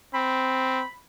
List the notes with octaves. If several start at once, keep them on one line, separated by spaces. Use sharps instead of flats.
C4 B5